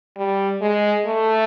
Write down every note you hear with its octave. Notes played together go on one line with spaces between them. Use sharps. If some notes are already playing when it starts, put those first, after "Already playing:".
G3
G#3
A3